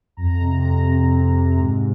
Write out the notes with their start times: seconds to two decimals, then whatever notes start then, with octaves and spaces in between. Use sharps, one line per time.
0.17 F2 A#5
0.40 C3
0.52 A#5
0.64 F2
0.87 C3
1.11 C3
1.35 C3
1.58 G#2